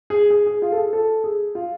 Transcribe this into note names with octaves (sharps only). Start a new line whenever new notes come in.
G#4
G#4
G#4
F4
A4
G#4
A4
G#4
F4